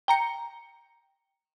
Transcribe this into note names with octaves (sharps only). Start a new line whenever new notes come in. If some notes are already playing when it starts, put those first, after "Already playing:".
G5 A#5 C#7